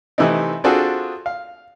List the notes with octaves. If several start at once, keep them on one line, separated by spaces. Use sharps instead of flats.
C3 E3 A3 C4 D#4
C4 D4 F4 F#4 G#4 A4
F5